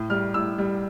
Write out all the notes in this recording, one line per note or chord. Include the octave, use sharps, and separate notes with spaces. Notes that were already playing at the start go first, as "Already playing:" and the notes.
Already playing: A2
G3 F6
A2 E6
G3